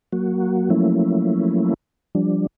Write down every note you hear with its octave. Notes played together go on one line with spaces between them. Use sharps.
F#3 A#3 F#4
F3 F#3 A3 A#3 C#4 E4
F3 G3 D4